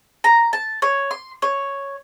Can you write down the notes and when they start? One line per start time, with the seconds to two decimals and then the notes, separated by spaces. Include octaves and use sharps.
0.24 A#5
0.53 A5
0.82 C#5
1.11 C6
1.42 C#5